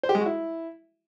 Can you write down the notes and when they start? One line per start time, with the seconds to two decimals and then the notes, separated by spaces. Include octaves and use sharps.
0.03 C5
0.09 G4
0.15 G#3
0.20 F#4
0.26 E4